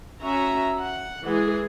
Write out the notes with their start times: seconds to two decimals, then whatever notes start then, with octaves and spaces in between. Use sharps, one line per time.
0.22 C#4 F#4 E5 A#5
0.81 F#5
1.24 E3 G#3 G#4